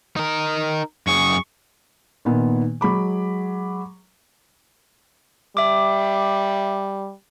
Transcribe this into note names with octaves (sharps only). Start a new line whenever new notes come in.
D#4 A#4
F#2 G#4 C#6
A#2 D#3 B3
F#3 G#3 B5 D6
G3 E5 D6